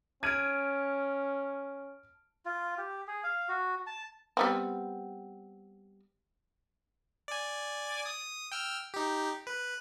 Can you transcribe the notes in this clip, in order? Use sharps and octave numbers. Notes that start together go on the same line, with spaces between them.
C#4 A5 F6 G#6 D7 D#7
F4
G4
G#4
F5
F#4
A5
G3 B3 C4
D5 G#5
D#6
G5 E6 F6
D#4 G4
B4